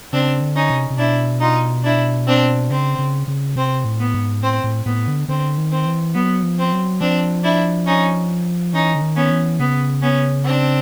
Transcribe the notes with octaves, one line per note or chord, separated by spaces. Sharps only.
C#3 C4 D4
D3
C#4 D#4
C3
C3
B2 D4 E4
D#4 F4
D4 E4
C4 D4
C#3 C4
C#3
C#3
C3 C4
A2
B3
G#2
A2 C4
A2
A2 B3
D3
D3 C4
D#3
C4
E3
F#3 B3
F3
C4
F#3
F3 C4 D4
D4 E4
C#4 D#4
E3 C#4 D#4
D3
D#3
B3 C#4
E3
C#3 B3
B3 C#4
C4 D4